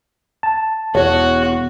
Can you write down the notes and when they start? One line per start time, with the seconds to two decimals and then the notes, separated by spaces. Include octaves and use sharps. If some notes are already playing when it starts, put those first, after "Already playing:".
0.43 A5
0.95 E1 E2 F#4 C#5